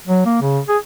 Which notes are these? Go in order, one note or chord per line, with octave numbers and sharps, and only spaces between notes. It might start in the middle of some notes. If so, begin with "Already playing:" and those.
F#3
A#3
C#3
G#4